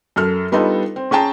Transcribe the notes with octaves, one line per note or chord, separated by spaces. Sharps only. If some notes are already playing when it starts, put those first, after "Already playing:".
F#2 A4 F6
G3 B3 D4 D#4 F4 A4
C4
C#4 G#4 G5 A5 A#5